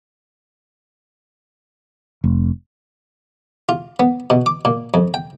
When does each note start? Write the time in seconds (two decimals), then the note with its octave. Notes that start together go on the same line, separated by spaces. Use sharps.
2.24 F1
3.69 F4
4.00 B3
4.30 B2
4.46 D6
4.65 A#2
4.94 F2
5.14 G5